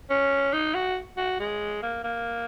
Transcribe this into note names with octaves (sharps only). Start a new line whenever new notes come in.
C#4
D#4
F#4
F#4
G#3
A#3
A#3